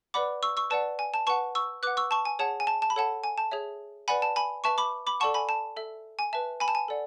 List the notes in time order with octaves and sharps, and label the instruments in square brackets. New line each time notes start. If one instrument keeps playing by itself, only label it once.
[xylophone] B4 D5 F#5 B5 D6
C#6 E6
C#6 E6
B4 D5 F#5 A5
G#5
A5
B4 F#5 A5 C#6
C#6 E6
B4 F#5 D6 F#6
C#6 E6
A5 C#6
G#5
G#4 C#5 F#5 A5
G#5
A5
A5
B5
A4 C#5 F#5 A5
G#5
A5
G#4 C#5 E5
B4 D5 F#5 G#5 B5
A5
G#5 B5
B4 E5 A5 C#6
B5 D6
B5 D6
A4 D5 F#5 A5 C#6
G#5 B5
A5
A4 E5
G#5
B4 E5 A5
G#5 B5
A5
G#5
A4 D5 F#5